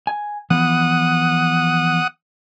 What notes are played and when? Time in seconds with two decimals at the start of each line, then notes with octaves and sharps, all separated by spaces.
0.07 G#5
0.50 E3 F3 B3 F#5 D#6